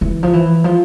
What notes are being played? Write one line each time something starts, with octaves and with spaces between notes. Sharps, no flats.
E3
F3
E3
F3